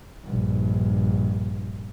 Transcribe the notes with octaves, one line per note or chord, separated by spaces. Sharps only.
A#1 G2